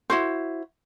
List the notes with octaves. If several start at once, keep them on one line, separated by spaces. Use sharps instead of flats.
E4 F#4 C5